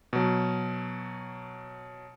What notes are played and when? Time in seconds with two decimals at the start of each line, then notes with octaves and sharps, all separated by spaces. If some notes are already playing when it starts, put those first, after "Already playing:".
0.13 B2 F#3